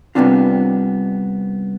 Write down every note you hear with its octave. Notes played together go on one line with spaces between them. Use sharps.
C2 D3 B3 C4 D4 F4